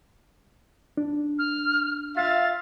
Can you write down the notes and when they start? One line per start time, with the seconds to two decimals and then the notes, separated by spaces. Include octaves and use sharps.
0.97 D4
1.38 F6
2.17 F4 E5 F5 A6